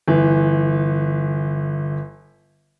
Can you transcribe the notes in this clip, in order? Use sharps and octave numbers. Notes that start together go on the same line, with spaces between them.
G1 E3